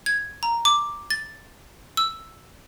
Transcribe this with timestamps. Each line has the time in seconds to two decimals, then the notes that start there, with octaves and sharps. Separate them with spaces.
0.06 G#6
0.43 A#5
0.65 D6
1.10 A6
1.97 E6